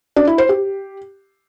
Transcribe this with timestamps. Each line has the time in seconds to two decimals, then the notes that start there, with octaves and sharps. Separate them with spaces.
0.16 D4
0.27 E4
0.38 C5
0.49 G4